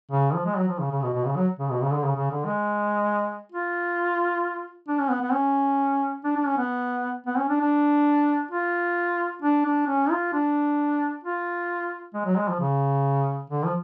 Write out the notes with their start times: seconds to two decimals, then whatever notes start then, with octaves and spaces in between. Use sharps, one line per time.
0.12 C#3
0.34 F3
0.45 G#3
0.57 F#3
0.68 F3
0.80 C#3
0.91 C#3
1.03 B2
1.14 B2
1.26 C#3
1.36 F#3
1.59 C#3
1.71 B2
1.82 C#3
1.94 D3
2.05 C#3
2.16 C#3
2.31 D3
2.46 G#3
3.52 F4
4.89 D4
5.00 C#4
5.11 B3
5.22 B3
5.33 C#4
6.25 D4
6.36 D4
6.47 C#4
6.58 B3
7.27 B3
7.38 C#4
7.50 D4
7.61 D4
8.51 F4
9.42 D4
9.65 D4
9.87 C#4
10.11 F4
10.34 D4
11.24 F4
12.14 G#3
12.25 F#3
12.37 G#3
12.49 F3
12.60 C#3
13.50 D3
13.65 F3